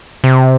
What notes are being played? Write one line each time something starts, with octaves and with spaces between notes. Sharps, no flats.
C3